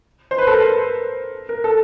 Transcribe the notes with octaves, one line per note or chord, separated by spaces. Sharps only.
C5
B4
A4
A#4
A#4
A4